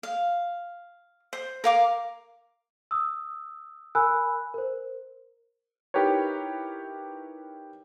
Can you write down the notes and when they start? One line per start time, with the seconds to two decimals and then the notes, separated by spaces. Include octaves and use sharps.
0.03 F5
1.33 C5
1.64 A#4 F5 D6
2.91 D#6 E6
3.95 A#4 G#5 B5 E6 F#6
4.54 A#4 C5
5.94 D#4 E4 G4 A#4 B4 C#5